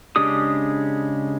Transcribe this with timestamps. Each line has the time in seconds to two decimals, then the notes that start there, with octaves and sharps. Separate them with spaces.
0.16 C#3 G#3 D4 G4 D#6